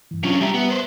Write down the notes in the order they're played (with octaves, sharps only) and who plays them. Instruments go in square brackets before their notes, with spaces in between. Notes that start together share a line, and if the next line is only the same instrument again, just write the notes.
[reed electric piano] G2 E3
[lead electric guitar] C3 C#4 [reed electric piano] F#3 D4 F4
[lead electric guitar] F3 G4 [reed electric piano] G3 E5 A#5
[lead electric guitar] B3
B4 C5